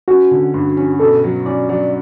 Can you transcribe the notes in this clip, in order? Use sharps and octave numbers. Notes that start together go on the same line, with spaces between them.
C#4 F#4
D3
G2
C#4
B2 A4
F#3
C#4 D5
F#3 D5